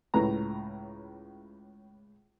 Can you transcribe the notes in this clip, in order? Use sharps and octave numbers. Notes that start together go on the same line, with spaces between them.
C#2 A2 B4 A#5